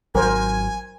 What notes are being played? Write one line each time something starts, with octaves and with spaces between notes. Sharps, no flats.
G#1 F#3 A#4 C5 G#5